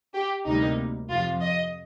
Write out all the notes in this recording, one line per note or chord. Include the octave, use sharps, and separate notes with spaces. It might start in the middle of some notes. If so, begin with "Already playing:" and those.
G4
D2 C3 G3 A#3 D#4
F2 C3 F3 F4
D#5